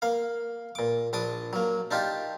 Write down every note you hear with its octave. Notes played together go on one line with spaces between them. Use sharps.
A#3 F5
A#2 D6
A#1 D4 D6 D#6
F#3 A#3
D4 D#4 F4 G4